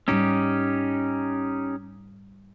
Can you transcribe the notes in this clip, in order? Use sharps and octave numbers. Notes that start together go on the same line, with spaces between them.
G#2 G3 C#4 D#4 G4